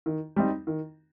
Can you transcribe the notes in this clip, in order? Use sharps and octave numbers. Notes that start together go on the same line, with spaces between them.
D#3
G3 C4 D#4
D#3